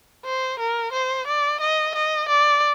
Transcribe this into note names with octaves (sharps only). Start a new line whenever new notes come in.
C5
A#4
C5
D5
D#5
D#5
D5